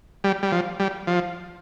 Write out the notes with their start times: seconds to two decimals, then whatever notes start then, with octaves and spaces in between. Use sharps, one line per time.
0.24 G3
0.43 G3
0.52 F3
0.80 G3
1.07 F3